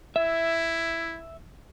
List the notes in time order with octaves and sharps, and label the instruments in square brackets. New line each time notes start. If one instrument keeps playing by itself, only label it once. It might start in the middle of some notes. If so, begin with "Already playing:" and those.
[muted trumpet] E4 [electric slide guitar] E5